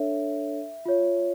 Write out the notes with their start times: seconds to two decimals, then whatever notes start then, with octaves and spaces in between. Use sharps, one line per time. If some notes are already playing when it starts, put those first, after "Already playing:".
Already playing: D4 A4 C#5 E5
0.86 F4 C#5